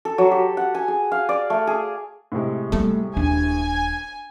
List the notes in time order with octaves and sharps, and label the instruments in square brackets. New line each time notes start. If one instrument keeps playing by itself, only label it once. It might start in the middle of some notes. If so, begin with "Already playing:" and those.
[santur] A4
F#3
G4
F#5
G#5
G#4
F5
D5
A3
G#4
[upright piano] A2 C3 G#3
[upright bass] G3 B3 [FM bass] A3
[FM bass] D#1 [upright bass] D4 [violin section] G#5